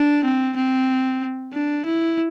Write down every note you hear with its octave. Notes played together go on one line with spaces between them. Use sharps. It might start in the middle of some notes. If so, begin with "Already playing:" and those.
Already playing: D4
C4
C4
D4
E4